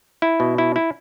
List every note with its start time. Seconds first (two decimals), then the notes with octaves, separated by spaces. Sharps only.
0.22 E4
0.40 B2
0.58 E4
0.76 E4